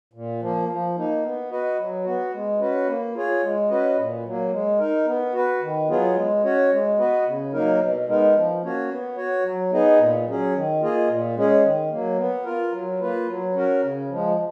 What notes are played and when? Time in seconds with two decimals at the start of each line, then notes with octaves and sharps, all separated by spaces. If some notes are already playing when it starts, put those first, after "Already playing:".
0.13 A#2
0.41 F3 A#3
0.69 F3
0.96 A#3 D#4
1.23 B3
1.50 F#4 B4 D#5
1.78 F#3
2.05 B3 F#4
2.33 G#3
2.60 C#4 F#4 B4
2.87 A#3
3.15 F4 G#4 C#5
3.43 G#3
3.69 C#4 F#4 B4 D#5
3.97 A#2
4.24 F#3 A#3
4.52 G#3
4.79 D#4 A#4
5.06 B3
5.33 F#4 B4
5.61 D#3
5.88 F#3 B3 F4 G#4
6.15 G#3
6.43 C#4 F#4 C#5
6.71 G#3
6.98 B3 F#4 B4 D#5
7.26 C#3
7.52 F#3 A#3 D#4 A#4
7.79 B2
8.07 G#3 B3 D#4 A#4
8.35 F3
8.61 A#3 C#4 F#4 C#5
8.89 B3
9.16 F#4 C#5
9.44 F#3
9.71 B3 D#4 G#4 D#5
9.98 A#2
10.26 F#3 C#4 G#4
10.54 D#3
10.81 A#3 F4 G#4 D#5
11.08 A#2
11.36 G#3 C#4 G#4
11.62 D#3
11.90 F#3 A#3
12.18 B3
12.45 F4 A#4
12.73 F#3
13.00 A#3 F4 B4
13.28 F#3
13.54 C#4 F#4 A#4
13.82 C#3
14.09 F3 G#3